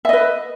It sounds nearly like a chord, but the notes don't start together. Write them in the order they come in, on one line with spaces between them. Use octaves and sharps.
E5 D#5 B4